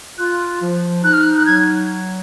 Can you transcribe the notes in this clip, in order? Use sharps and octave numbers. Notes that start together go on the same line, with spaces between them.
F4 F#6
F3
D#4 F#6
F6
F#6
F#6
F#3 G#6